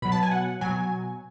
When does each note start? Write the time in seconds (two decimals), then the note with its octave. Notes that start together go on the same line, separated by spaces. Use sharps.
0.02 B2 F#3 B5
0.12 A5
0.23 G#5
0.31 F#5
0.61 B2 F#3 G#5